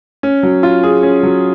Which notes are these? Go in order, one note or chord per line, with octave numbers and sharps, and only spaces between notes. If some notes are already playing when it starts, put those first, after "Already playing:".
C#4
F#3
F4
G#4
C#4
F#3